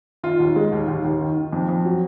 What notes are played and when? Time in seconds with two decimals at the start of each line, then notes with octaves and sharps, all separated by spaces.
0.23 D#3 F4
0.40 D#2
0.56 G#3
0.72 D#2
0.88 D#2
1.05 D#2
1.21 D#3
1.37 D#3
1.53 F2
1.69 F2
1.85 F#3